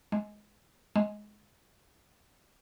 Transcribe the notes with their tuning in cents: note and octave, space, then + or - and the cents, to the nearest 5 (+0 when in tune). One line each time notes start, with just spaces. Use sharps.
G#3 +10
G#3 +10